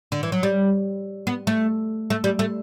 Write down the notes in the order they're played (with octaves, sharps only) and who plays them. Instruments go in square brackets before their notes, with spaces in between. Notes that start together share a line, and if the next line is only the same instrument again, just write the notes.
[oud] D3
E3
F#3
G3
B3
A3
A3
G3
A3